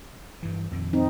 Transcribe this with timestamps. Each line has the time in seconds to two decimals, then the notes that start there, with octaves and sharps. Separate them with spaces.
0.43 G2 E3
0.71 F2 A#2 D#3
0.93 C4 D#4